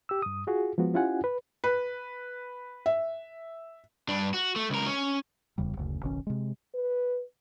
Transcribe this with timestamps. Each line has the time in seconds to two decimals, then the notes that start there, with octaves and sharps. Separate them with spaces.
0.09 G4 E6
0.22 G2 D#6
0.47 F4 F#4 G#4
0.78 F3 G#3 B3 F#4
0.94 C#4 E4 F4 G4 F#5 G#5
1.24 B4
1.64 B4
2.86 E5
4.08 G2 D4
4.34 F#4
4.56 A3
4.70 C#2 A#4
4.86 C#4
5.58 D1 E2 C#3 G3
5.77 F#1 D2 C#3
6.03 F#1 B1 D#3 C#4
6.27 C3 G#3
6.75 B4